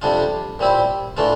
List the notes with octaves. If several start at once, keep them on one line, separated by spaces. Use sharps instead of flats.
F2 C3 G3 D4 F4
A#2 G3 C4 E4
A2 E3 A3 D4 F4